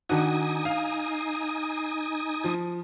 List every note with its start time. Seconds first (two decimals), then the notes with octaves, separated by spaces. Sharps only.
0.09 D#3 D4 D#4 F#4 G#5 D#6
0.65 F5
2.44 F3